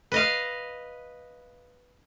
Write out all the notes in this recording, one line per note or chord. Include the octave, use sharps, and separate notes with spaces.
B4 D#5 F5